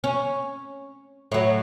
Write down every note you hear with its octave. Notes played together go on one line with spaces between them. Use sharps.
C#4
A2 F#3